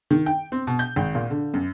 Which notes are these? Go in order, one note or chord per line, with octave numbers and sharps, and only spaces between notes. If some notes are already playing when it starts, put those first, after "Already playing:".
D#3
G5
C4
B2
G6
G#1
A#2
D3
F#2